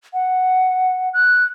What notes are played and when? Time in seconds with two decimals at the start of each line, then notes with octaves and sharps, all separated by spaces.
0.13 F#5
1.14 F#6